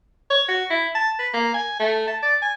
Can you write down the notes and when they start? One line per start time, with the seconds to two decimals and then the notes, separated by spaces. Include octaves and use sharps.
0.30 C#5
0.48 F#4
0.70 E4
0.95 A5
1.19 B4
1.34 A#3
1.54 G#5
1.80 A3
2.08 A5
2.23 D5
2.42 G#5